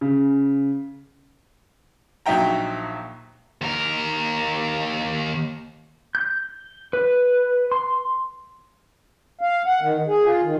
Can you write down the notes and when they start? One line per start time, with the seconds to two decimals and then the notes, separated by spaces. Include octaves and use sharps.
0.01 C#3
2.26 A#1 F#3 D#4 E5 G5 A#5
3.62 D#2 A#4
6.15 G6
6.93 B4
7.72 C6
9.41 F5
9.66 F#5
9.81 D#3
10.07 G#4
10.26 F4
10.43 D#3